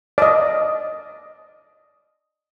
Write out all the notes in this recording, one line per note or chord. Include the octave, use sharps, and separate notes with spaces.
D5 D#5